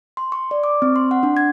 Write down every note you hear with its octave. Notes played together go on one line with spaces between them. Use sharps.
C6
C#6
D5
D6
C4
C6
F#5
D4
G#6